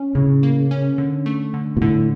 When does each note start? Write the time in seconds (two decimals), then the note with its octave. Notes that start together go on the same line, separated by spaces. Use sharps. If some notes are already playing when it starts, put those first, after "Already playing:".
Already playing: C#4
0.15 A2 C#3
0.43 A#3
0.71 C#4
0.98 D3
1.26 A3
1.54 D3
1.77 A#2
1.81 A2 D3